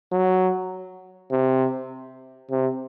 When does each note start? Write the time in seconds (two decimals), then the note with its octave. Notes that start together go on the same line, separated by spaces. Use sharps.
0.12 F#3
1.31 C3
2.51 C3